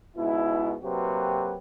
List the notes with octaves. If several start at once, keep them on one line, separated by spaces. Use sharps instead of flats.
C#2 G#2 B2 E4
C3 F#3 A#3 F#4 G4 B4